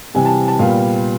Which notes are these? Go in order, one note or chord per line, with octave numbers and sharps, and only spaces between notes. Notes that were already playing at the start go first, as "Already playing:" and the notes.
C3 E3 G3 G#5
A5
A5
A#2 G3 B3 F5